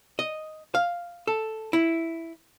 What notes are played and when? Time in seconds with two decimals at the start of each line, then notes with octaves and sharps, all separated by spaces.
0.19 D#5
0.75 F5
1.27 A4
1.73 E4